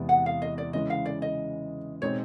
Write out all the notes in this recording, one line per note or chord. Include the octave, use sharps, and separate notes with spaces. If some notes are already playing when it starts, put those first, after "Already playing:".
Already playing: E2 C3 E3 G#3 B3
F#5
F5
D#5
D5
C#3 E3 G#3 D#5
F5
D5
D#5
B2 G#3 C4 D#4 C#5